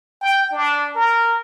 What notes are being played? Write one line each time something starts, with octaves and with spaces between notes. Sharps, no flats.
G5
D4
A#4